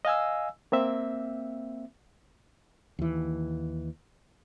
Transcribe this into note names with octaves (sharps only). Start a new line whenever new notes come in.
D#5 F5 G#5 E6
A#3 C4 E5
D#2 E3